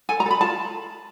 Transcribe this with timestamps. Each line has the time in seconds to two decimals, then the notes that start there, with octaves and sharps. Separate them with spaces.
0.09 A4 G#5
0.20 A#5
0.26 A4
0.31 B5
0.41 F4 A5